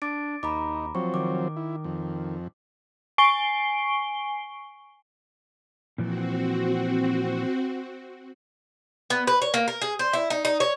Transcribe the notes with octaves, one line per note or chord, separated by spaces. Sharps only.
D4 D6 A6 D7
D#2 D#4 A#5 B5 D6
F3 F#3 C4 C#6
D#3 D6
E4
F2
G#5 C#6 C7 D7 G7
A#2 E3 F3 C4 F#4
B3
B4
C#5
A#3
A#4
G#4
C5
E4
D#4
D#4
C#5